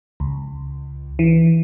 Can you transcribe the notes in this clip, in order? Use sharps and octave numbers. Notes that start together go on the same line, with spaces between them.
C#2
E3